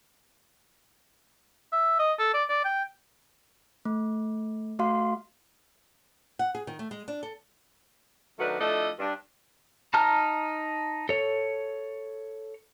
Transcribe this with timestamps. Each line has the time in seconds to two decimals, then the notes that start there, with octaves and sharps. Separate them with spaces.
1.73 E5
1.99 D#5
2.19 A4
2.34 D5
2.49 D5
2.65 G5
3.85 A3
4.79 A3 F#4 F5 C6
6.39 F#5
6.55 G#4
6.67 D#3
6.79 A3
6.91 G#3
7.08 D4
7.23 A4
8.39 D#3 F#3 A3 D4 F#4 B4
8.59 F3 A3 D4 E4 A4 D#5
8.99 G2 D4
9.94 D#4 A5 A#5 F6
11.09 A4 C#5